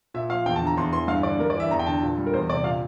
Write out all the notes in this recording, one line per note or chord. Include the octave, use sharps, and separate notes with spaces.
A#2 E5
F3 F5
E2 G5
A5
D3
A#5
E2 C6
E3 C6
G2 F5
D3 D5
G2 A#4
D5
E3 E5
E2 A#5
G5
D3 A5
A#2
G3
A#4
E2 C5
C3 D5
A#2 F5